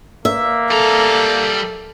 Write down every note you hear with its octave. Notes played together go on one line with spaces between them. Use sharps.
A#3 E5
G3 A4 A#5